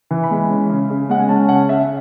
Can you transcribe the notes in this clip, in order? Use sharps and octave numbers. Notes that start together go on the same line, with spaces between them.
E3
B5
G#3
C#4
C#3
C#3
G#3 F#5
G#5
C#4 A5
C#3 F#5
C#3 E5